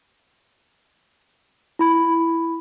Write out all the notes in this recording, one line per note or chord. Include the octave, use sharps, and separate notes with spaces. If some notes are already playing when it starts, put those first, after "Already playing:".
E4 B5